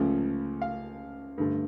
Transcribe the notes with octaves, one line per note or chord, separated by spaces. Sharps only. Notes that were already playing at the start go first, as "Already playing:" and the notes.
Already playing: C#2 C#3 F3 A3
F5
G2 D3 A3